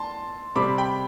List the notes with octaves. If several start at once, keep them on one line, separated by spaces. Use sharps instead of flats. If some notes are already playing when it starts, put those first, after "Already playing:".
Already playing: A5 C6
C3 G3 C4 B5 D6
G5 B5